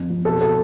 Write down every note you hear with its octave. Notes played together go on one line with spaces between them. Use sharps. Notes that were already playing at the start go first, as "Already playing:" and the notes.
Already playing: F2 F3
F2
B2 A4
B2 A4